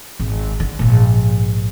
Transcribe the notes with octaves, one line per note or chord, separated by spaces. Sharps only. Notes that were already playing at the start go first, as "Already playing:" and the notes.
G#1
D3
A#1 G#2